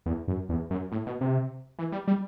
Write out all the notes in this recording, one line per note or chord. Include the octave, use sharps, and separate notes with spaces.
E2
F#2
E2
F#2
A2
B2
C3
E3
G3
G3